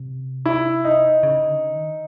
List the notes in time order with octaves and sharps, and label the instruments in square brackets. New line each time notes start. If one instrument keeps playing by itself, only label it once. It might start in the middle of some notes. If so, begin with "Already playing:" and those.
Already playing: [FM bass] C3
[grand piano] E4
D#4
[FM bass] C#3
D3
D#3